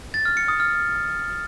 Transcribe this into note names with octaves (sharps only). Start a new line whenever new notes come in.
A6
F6
C#7
D#6
F6